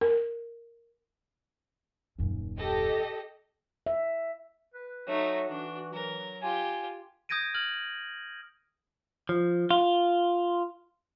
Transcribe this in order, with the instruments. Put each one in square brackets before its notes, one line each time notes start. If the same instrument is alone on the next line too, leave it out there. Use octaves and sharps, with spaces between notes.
[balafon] A#4
[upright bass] D#1 F#2
[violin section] G4 A4 D#5
[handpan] E5
[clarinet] B4
[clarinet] F#3 [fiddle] A3 D#4 [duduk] F#4
[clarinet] E3 [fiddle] D4
[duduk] F#3 [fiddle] A#4
[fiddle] F4 G4 [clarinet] G#5
[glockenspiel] D#6 G6 G#6 A#6 D7 D#7
F6 G#6 F#7
[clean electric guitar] F3
F4